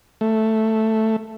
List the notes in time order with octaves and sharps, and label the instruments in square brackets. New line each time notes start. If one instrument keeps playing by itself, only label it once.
[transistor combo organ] A3